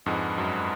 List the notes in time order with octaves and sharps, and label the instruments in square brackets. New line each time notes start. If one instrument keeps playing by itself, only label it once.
[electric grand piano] F2 G#2 [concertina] G#3 D4 G#4 B4 F#5
[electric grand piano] F#2